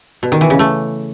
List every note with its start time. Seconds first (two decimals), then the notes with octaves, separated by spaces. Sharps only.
0.23 B2
0.32 D#3
0.41 E3
0.50 C#3
0.59 A3